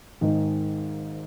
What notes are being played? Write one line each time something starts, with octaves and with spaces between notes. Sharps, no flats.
G#1 G#2 D#3 G#3 D#4